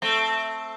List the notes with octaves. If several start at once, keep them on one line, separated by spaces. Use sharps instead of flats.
A3 C4